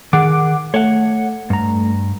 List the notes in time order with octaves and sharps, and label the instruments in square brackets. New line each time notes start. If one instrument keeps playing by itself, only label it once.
[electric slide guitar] D#3 G#4 [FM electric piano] F#5 D6
[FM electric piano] A3 [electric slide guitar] C#5 F#5
[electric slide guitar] G2 A#5